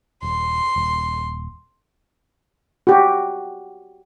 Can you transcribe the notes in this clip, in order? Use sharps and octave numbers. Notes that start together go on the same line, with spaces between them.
D#1 C6
D#1
F#4 G4